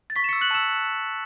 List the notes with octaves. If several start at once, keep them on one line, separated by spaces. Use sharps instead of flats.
A6
C#6 B6
E7
C#6 E6 C#7
F#6 F#7
A5 E6 E7